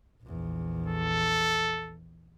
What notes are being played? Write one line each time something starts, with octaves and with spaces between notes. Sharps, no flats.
A#1 E2
A4